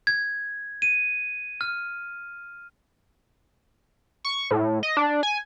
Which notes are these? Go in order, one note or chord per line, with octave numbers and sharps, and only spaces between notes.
G#6
D#7
F6
C#6
A2
D#5
D4
G#5